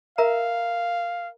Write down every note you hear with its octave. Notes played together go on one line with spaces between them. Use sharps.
A#4 E5 F5 A#5